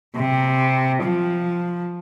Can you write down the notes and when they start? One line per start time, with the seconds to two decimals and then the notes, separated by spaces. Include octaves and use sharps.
0.16 C3
1.03 F3